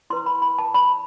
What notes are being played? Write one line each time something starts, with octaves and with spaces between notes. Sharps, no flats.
E4 B4 C6
B5
B5
A5
B5